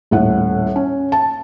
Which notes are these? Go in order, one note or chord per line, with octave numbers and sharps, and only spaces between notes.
D#1 A2 F#5
C#4
A5